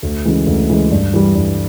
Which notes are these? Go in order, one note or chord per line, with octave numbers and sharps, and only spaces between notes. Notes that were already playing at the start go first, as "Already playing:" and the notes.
D2
C#3 E3 G#3
D2
C#3 E3 G#3
G2
E3 G3
G2